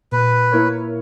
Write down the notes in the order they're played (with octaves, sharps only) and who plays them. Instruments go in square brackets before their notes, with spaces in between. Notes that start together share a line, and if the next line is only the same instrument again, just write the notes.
[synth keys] A#2 [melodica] B4
[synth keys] A#3 E4 A#4 C#5